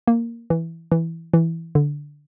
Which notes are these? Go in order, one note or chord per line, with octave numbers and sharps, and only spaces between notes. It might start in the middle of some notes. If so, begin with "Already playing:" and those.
A#3
E3
E3
E3
D3